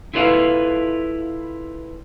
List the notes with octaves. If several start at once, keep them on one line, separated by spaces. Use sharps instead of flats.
E4 F4 A4 B4 C5 F5